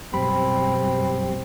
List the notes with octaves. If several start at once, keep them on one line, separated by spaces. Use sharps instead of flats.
F#2 B2 G3 C4 B5